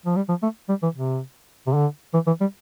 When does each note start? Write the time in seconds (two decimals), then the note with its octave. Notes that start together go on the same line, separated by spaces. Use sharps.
0.06 F3
0.16 G3
0.29 F3
0.43 A3
0.69 G3
0.83 E3
0.95 C3
1.67 C3
1.74 D3
2.14 E3
2.27 E3
2.40 G3